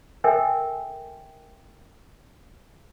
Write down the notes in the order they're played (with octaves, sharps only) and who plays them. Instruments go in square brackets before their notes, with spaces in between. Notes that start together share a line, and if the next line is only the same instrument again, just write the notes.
[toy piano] A4 A#4 E5 G5 G#5